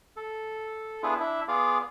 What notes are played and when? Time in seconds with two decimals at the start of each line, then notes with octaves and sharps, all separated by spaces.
0.16 A4
1.03 B3 D4 E4 F4 G#4 B4
1.20 D4 E4 E5
1.48 B3 F4 G#4 D5 F5